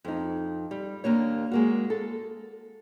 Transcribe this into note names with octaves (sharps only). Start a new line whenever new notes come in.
F2 D#4
G3
D#2 A#3 D4 C#5
G#3 A#3 F#4
A4